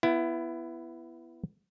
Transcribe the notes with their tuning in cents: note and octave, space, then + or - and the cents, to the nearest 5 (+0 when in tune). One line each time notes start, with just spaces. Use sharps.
B3 +0 E4 +20